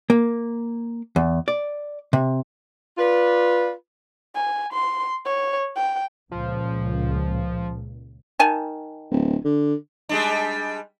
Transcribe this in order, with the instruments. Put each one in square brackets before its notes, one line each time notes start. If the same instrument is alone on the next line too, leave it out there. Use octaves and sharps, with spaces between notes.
[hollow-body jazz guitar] A#3
E2
D5
C3
[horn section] F4 B4 D5
[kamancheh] G#5
C6
C#5
G5
[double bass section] C#2 A#2 [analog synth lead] F3
[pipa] D#3 G#5 A5
[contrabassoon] D1
D3
[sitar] G3 G#3 D4